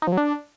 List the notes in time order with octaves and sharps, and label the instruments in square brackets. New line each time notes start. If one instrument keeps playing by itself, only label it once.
[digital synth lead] D#4
F3
F#3
D4